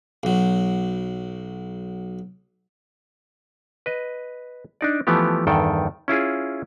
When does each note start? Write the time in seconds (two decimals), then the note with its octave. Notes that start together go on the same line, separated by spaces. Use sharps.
0.23 B1 F#3
3.86 B4 D#5
4.81 D4 D#4 D5
5.07 E3 F3 A3 B3 G4
5.47 E2 G2 D#3 A4 G5
6.08 C#4 E4 F4 G#4